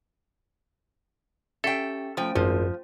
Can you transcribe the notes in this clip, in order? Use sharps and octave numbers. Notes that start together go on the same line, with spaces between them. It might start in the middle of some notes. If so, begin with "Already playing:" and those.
C#4 G4 A4 E5 G5 C#6
F3 A3 C#4 C5 G5
G#1 F#2 F3 F4 C5